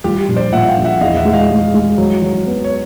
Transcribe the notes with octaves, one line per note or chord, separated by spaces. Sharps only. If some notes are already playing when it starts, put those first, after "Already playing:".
G3 F4 G4
A#1
C5 D5
A#2 E5 F#5
F5 G5
A#1
E5 F#5
E2 D#5 F5
E5 F#5
G#3
D#5 F5
G#3
G#3
F#3
F#3
B3
C#5